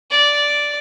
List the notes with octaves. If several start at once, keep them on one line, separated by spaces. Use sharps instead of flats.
D5